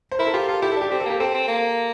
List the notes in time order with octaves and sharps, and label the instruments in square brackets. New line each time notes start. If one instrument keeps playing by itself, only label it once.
[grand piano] C5
[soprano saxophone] E4 [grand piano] A#4
[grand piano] A4
[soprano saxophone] F4 [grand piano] G4
[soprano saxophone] F4 [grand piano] A4
[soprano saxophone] E4 [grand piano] G4
[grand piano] A4
[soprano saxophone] D4 [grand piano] G4
[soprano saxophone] C4 [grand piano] G4
[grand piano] A4
[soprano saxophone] A#3 [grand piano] G4
[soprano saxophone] C4 [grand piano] A4
[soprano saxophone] C4
A#3